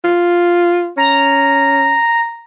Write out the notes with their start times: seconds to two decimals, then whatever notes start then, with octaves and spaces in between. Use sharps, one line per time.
0.04 F4
0.97 C#4 A#5